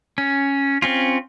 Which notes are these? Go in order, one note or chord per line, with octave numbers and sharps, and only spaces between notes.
C#4
C4 C#4 F4